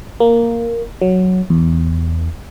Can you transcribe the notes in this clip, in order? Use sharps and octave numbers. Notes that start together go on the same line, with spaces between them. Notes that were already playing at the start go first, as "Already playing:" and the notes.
A#3
F#3
E2